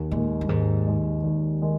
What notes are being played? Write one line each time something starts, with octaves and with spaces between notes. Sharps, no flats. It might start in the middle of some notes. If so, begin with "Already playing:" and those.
Already playing: D#2
A#2 D#3 G#3
G2
D#2 G#2
D#3 G#3
D#2
D#3 G#3